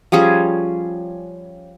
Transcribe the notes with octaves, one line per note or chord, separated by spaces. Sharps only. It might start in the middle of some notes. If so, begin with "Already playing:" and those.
F3 G3 C#4 G#4